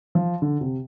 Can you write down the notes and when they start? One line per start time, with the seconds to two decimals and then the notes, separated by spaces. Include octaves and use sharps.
0.15 F3
0.42 D3
0.61 C3